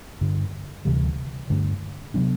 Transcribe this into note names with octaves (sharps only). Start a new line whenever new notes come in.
G2 D3 G3
D2 C3 E3 G3
G2 D3 A3 D4
C3 F#3 B3 D4